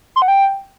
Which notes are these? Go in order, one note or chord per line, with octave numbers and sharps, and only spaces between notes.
C6
F#5
G5